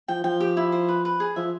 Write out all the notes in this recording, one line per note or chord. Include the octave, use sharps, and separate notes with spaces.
F3 G5
F3 G5
G4
E4
C5
B4
B4
G#4
F3 E5